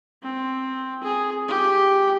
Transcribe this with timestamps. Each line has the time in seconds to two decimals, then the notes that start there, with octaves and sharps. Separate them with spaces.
0.22 C4
1.03 G#4
1.49 G4